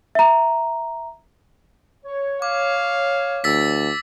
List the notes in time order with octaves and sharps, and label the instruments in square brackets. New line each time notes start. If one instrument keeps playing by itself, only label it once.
[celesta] E5 A#5
[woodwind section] C#5
[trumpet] F5 [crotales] D6
[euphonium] D2 [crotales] E6 A6 B6